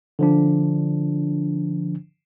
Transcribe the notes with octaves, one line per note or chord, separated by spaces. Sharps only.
D3 F3 D4